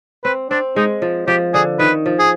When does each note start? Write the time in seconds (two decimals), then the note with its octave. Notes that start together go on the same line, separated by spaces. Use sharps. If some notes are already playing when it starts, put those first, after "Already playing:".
0.24 C4 B4
0.51 C4 D4
0.76 G#3 D#4
1.02 F3
1.28 F3 G4
1.54 D3 G#4
1.79 D#3 B4
2.06 F3
2.19 G#4